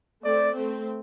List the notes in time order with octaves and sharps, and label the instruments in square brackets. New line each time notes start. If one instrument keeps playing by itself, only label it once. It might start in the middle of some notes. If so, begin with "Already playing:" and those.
[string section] A3 C4 [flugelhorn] D5
[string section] A3 C4